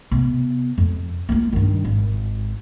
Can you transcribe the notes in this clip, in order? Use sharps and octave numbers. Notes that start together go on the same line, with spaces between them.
C3 B3
F2
A#3 F4
G2 D#3
G#1